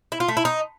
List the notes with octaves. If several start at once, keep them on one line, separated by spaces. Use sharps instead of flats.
E4
F4
A3
E4
D#4